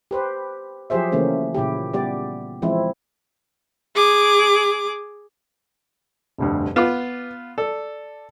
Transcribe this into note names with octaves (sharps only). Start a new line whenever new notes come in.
G4 B4 C5
F3 F#3 G4 G#4 C5 E5
C#3 E3 A3 A#3 C#4
A#2 C#3 E4 G4
G3 B3 G4 D5
E3 F3 G#3 C4 E4
G#4 D6
F1 D2 G2
B3 F4 B4 D6
A4 D5